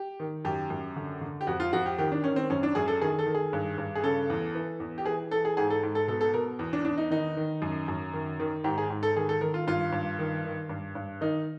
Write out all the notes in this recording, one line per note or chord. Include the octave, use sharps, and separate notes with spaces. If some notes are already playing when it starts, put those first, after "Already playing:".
Already playing: G4
D#3
F#2 G4
F#2
D3
D3
G4
F2 F#4
F4
F2 F#4
G4
D#3 G4
D4
D#3 C#4
C4
F#2 C#4
D4
F#2 G#4
A4
D#3 G#4
A4
D#3
G#4
G2
G2
G#4
C#3 A4
E2
E3
E2
G4
E3 G#4
E3 A4
G#4
G#2 G#4
A4
G#2
A4
B2 A4
A4
B2 A#4
E2
D4
E2 D4
D#4
D#3 D#4
D#3
F#2
F#2
D#3
D#3
G#2 G4
G#4
G#2
A4
D#3 G#4
A4
D#3 A#4
F4
G2 F4
G2
D#3
D#3
G2
G2
D#3 D#4